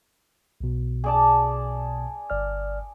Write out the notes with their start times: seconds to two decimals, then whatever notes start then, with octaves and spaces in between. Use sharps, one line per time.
0.61 B1 B2
1.04 G#4 D5 A5
2.30 G1 D5 F6